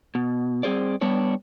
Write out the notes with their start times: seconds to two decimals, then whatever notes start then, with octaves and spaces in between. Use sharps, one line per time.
0.15 B2
0.63 G3 C4 G#4 C5 D5
1.01 G3 B3 D4 C#5